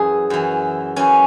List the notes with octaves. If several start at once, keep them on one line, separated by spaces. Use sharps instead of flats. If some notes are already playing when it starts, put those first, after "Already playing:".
Already playing: F#2 E3 G#4
F#2 E3
F#2 E3 C#4